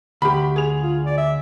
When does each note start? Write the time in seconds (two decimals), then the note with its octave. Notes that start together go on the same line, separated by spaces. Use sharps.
0.22 D2 G4 B5
0.56 G#4 F7
0.82 F4
1.05 D5
1.17 E5